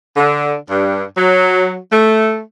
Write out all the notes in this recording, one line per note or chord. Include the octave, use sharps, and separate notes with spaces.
D3
G2
F#3
A3